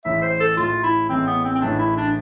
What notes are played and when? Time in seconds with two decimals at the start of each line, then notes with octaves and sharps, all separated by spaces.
0.05 A1 A2 E3 G#3 E5
0.22 C5
0.40 A4
0.57 A1 A2 E3 G#3 F4
0.83 E4
1.09 A1 A2 E3 G#3 C4
1.27 B3
1.44 C4
1.55 C4
1.61 A1 A2 E3 G#3 D4
1.79 E4
1.97 D4